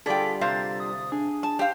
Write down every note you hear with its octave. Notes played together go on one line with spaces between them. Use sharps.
D3 G3 F4 G#4 A4 D5 G5 B6
C3 C5 F5 A#5 A6
D#6
D4 G#4
A5
G4 C5 F5